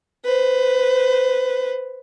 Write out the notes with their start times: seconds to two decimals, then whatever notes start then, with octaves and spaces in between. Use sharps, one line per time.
0.25 B4 C5